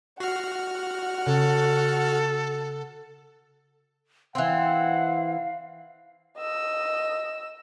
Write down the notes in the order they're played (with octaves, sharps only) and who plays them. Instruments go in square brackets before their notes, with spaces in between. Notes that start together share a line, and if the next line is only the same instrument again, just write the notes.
[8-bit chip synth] F#4 F6 [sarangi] F#5 [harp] C7
[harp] C#3 [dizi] A4
[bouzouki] E3 C4 [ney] F5 [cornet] F#5
[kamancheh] D#5 E6